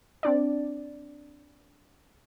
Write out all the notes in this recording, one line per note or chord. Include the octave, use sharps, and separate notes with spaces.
C4 D4 D5